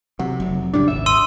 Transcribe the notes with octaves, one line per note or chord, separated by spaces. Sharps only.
C3 F#3
F1
A2 C#3 G3 D4
D#1 G#1 E5
C6 D#6 E6 D#7